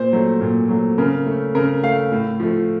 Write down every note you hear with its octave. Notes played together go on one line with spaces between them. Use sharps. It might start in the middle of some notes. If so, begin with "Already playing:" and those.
Already playing: A#2 C5
F#3 A3
A#2
F#3 A3
C#3 A#4
A3
C#3 A#4
A3 F5
A2
F3 A3